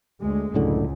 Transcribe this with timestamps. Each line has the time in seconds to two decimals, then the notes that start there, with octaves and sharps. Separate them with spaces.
0.20 D2 G#3
0.54 C#2 F#2 A2 D3